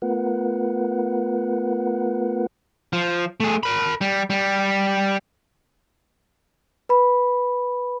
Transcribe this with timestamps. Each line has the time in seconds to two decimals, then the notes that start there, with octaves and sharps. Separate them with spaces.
0.02 A3 B3 F4 A#4 B4 F#5
2.93 F3
3.40 A3 G#4
3.63 A#4 B5
4.01 G3
4.30 G3
6.89 B4 B5